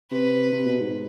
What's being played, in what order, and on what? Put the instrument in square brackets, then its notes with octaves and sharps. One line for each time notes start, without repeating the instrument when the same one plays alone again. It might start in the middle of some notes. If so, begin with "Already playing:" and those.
[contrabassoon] C3 [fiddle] B4
[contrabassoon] C3
B2
G#2